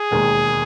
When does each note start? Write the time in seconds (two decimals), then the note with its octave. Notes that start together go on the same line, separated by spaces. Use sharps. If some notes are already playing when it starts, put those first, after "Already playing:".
Already playing: G#4
0.11 E1 D#2 D#3 G#3